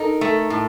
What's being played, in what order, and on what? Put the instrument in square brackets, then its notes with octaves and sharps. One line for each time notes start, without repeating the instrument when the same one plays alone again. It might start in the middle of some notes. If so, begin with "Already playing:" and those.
Already playing: [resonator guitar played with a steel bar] D#4 A4 [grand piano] A#4
[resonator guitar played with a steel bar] A3
A2